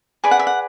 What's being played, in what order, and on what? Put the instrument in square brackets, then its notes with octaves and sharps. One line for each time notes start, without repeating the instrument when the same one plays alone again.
[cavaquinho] G#4 B4 D5 G#5
F#5
E5
F#5